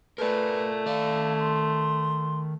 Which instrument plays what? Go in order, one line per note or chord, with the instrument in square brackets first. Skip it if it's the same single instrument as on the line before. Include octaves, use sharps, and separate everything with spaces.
[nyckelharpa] A3 [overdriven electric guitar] A#4 D5 [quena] B4
[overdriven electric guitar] D#3 D5 [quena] F5
[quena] C6